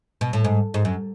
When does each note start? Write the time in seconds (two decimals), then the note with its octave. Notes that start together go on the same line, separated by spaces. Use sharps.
0.21 B2
0.33 A2
0.45 G#2
0.74 G#2
0.85 F#2